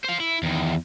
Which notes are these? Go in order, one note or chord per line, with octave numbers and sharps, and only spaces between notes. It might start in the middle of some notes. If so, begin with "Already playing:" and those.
C5 F5
E4
E2 D#3